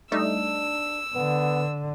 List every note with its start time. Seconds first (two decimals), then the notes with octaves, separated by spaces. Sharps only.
0.12 G3 A3 D4 D#4 E6
1.15 D3 B3